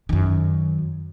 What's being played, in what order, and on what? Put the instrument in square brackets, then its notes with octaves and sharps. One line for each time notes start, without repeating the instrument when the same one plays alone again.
[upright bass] F#2 D#3